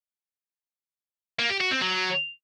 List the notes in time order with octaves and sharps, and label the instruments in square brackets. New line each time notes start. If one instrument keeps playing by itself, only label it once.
[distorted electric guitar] A#3
G4
F#4
C4
F#3